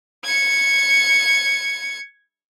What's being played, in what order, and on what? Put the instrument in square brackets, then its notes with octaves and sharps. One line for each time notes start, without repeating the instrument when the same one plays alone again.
[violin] G#6 C#7